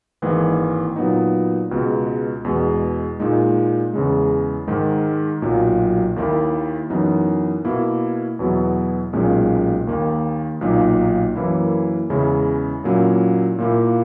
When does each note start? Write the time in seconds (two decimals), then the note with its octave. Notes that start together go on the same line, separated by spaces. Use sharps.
0.22 G#1 G#2 E3 A#3
0.96 A#2 F#3 B3 D#4
1.71 C#2 B2 G#3
2.45 E2 B2 G#3
3.20 A#2 G#3 D#4
3.93 E2 C#3 G#3
4.68 G#2 D#3 G#3 D#4
5.42 B1 A#2 F#3
6.16 D#2 D#3 A#3 E4
6.90 F#2 E3 B3 D#4
7.65 B2 A#3 E4
8.39 E2 B2 F#3 B3 E4
9.13 B1 A#2 G#3 C#4
9.87 D#2 D#3 A#3
10.61 B1 A#2 A#3 D#4
11.35 F#2 E3 A#3 E4
12.10 E2 C#3 G#3 C#4 E4
12.84 A#2 F#3 A#3 C#4 E4
13.58 A#2 A#3 E4